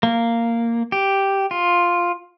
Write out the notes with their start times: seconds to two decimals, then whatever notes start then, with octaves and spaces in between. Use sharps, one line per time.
0.03 A#3
0.92 G4
1.51 F4